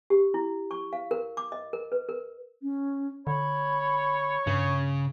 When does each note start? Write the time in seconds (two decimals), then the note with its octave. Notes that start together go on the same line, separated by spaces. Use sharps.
0.10 G4
0.34 E4
0.71 C#6
0.93 F5
1.11 A#4
1.37 D6
1.52 D#5
1.73 A#4
1.92 B4
2.09 A#4
2.62 C#4
3.27 D3 C#5 B5
4.47 G2 C#3